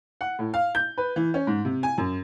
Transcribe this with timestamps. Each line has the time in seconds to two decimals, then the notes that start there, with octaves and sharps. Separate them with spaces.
0.21 F#5
0.39 A2
0.54 F5
0.75 G6
0.98 B4
1.16 E3
1.34 C#4
1.47 G#2
1.65 C3
1.83 G#5
1.98 F#2